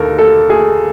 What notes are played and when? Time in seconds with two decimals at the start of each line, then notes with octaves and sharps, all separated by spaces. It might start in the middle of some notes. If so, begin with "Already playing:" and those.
Already playing: D#2 D3 A4 A#4
0.18 A4
0.50 G#4